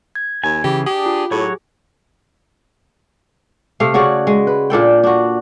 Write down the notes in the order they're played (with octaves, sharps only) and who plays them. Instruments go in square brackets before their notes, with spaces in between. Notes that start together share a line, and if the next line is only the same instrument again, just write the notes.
[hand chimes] G#6
[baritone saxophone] D#2 [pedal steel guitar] G#5
[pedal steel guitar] C#3 E3 [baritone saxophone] G4
[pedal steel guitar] D4 G#4 [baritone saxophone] G4
[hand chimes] F4 D6
[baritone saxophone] A2 [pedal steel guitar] F#3 C#5 C#6 [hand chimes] G4 G#4
[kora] C3 A3 F5
C#3 F#4 C#5 D5
G#3
B4
A#2 D4 A4 G5
D4 F#4